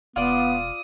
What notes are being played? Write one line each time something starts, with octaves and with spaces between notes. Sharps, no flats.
E1 B3 F4 D5 D#6